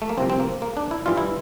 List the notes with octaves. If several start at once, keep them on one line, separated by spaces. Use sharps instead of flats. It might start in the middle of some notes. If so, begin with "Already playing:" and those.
A3
A#3
C2 C3 F3 C4
C4
A#3
A#3
D4
E4
G2 E3 G3 F4
E4